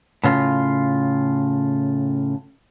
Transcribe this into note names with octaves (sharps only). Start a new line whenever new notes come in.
A2 C#3 F4